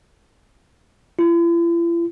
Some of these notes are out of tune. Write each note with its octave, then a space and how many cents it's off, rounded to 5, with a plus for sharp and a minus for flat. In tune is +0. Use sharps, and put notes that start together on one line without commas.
E4 +45